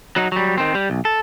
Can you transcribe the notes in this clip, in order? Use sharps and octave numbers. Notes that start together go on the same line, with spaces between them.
F#3 D#4
F#3 G3
D#3 C4
G3
B1
A4